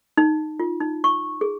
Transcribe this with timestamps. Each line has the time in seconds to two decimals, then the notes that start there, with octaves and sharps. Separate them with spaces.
0.17 D#4
0.60 F4
0.80 D#4
1.04 C#6
1.41 G#4